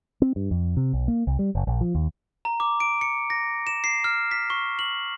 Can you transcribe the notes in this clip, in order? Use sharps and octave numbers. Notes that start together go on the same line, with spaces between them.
C4
G2
F2
C3
B1
A#3
C2
G3
F#1
A#1
F3
D#2
A#5
D6
D7
C#7
A#6
E7
C7
F6
B6
C#6
F#7